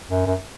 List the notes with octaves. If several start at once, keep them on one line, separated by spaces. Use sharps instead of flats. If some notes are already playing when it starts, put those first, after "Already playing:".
F#2
F#2